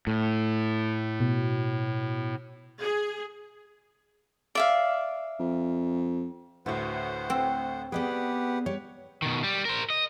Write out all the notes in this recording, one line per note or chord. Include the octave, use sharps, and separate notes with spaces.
A2
B2
G#4
D5 E5 F5
F2
D2 A2 F#4 B4 C5 F#5
C4
B3 G4 G#4 B4 D5 F#5 G5
G3 C#5
B2 D#3
G3
A#4 C5
D#5